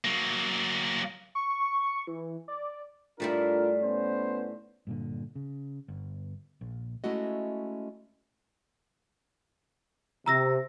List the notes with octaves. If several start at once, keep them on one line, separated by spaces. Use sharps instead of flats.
F#3 A#3
C#6
E3
D5
A2 G3 D4 E4 F4 A#4
B3 C#4 C5
G2 A#2 D3
C#3
G1
A#1
G#3 A3 C#4 E4 F#4 D#5
C3 A#5 E6 A#6